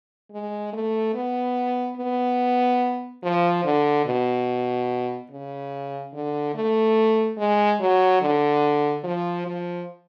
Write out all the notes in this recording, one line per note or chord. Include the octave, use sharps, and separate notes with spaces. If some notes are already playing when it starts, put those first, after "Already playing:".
G#3
A3
B3
B3
F3
D3
B2
C#3
D3
A3
G#3
F#3
D3
F3
F3